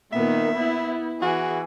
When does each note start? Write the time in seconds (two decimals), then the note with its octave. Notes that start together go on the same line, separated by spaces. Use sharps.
0.13 A#2 D#3 B3 E5
0.55 B3 E4
1.22 E3 F#4 G#4